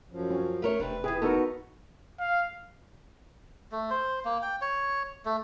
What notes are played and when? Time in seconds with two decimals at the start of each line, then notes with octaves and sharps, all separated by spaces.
0.11 F#2 F3
0.31 C#4
0.62 A3 A#4 C#5
0.80 E1 C3 C4 D4 B4
1.04 C3 E3 G#4
1.22 B3 D#4 F#4 A4 A#4
2.20 F5
3.72 A3
3.91 C5
4.25 A#3
4.42 G5
4.61 C#5
5.25 A3